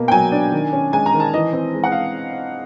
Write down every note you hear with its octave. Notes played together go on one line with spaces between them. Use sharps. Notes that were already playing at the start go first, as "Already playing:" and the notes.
Already playing: B2 A#3
G5
F#3 G#5
D4
D#3
C#4
G#3 G#5
A#5
D#3
A5
E3 D#5
C4
G#3
F#5
F5